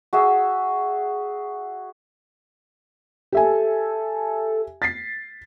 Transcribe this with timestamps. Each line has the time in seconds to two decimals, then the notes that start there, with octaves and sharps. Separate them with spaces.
0.13 F#4 G#4 E5
3.32 G4 A4 E5 G#5
4.82 A6 B6 C7